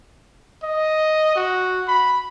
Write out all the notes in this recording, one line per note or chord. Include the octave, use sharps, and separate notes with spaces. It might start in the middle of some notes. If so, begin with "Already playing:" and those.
D#5
F#4
B5